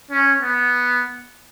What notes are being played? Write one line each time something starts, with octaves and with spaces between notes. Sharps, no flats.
C#4
B3